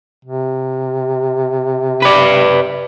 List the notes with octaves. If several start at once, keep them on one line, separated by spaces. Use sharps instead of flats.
C3
B4 D5